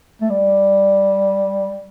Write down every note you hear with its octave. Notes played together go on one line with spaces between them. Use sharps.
A3
G3